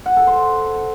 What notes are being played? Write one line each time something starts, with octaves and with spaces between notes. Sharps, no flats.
F#5
A4
C5